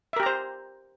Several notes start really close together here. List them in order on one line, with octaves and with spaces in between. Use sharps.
E5 A#4 G4 A#5 C5